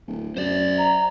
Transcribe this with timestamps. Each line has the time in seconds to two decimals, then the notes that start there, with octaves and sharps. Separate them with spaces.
0.07 D1
0.37 F#2 C5 D5
0.78 A#5